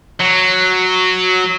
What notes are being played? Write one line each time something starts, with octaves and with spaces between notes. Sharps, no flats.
F#3